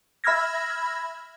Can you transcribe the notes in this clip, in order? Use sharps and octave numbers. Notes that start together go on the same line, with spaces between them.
E5 B5 E6 F6 G#6 A#6